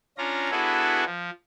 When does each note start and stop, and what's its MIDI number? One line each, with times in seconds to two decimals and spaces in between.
0.18 0.51 61
0.18 0.51 62
0.18 0.51 65
0.18 0.51 82
0.51 1.04 59
0.51 1.04 62
0.51 1.04 64
0.51 1.04 66
0.51 1.04 68
0.51 1.04 69
1.06 1.30 53